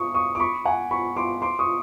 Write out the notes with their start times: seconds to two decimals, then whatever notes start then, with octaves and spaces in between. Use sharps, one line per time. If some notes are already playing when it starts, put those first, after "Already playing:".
Already playing: C#6 D#6
0.14 C#6 D#6
0.35 D6
0.40 B5 C#6
0.65 F#5 G#5
0.91 B5 C#6
1.17 C6 D6
1.42 C6 D6
1.59 C#6 D#6